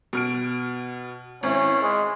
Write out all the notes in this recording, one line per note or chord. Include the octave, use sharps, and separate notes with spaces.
B2 F6 D7
G#1 C4 C#4 E4
G#3